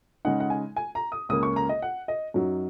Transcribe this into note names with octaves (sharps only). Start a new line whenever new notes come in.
C#3 G#3 D#4 F#5
F#5
G#5
G#5
A#5
D#6
C#2 C#3 A#3 D#6
C#6
A#5
D#5
F#5
D#5
F#2 F#3 D#4